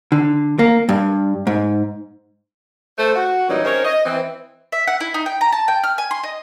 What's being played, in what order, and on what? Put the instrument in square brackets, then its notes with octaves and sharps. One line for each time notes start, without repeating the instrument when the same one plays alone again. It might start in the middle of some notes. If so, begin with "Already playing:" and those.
[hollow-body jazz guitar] D3
A#3
G2
G#2
[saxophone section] A3 C5
F#4
A#2 E3 F#3 G3 C#4 D#4
C4 C#4 D#4 A#4 C5 C#5
D#5
E3 C4
[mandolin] E5
F#5
E4
D#4
G5
A#5
A5
G5
F6
G#5
C6
D#5